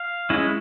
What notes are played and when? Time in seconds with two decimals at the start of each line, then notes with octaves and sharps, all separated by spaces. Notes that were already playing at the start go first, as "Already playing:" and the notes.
Already playing: F5
0.30 G#3 C#4 E4